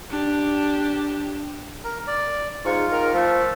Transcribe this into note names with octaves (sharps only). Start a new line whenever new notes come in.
D4 G4
A#4
D5
G#2 F4 C#6
D#3 A#4
F3 A3